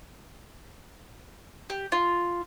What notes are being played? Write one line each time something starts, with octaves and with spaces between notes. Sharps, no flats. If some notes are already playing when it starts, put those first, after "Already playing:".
G4
F4